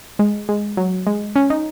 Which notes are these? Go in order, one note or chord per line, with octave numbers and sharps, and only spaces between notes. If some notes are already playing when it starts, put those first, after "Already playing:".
G#3
G#3
F#3
G#3
C#4
D#4